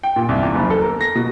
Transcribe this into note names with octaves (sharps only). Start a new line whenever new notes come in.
G5
A#2
C2
E2
F#1
A4
A#4
A#6
B2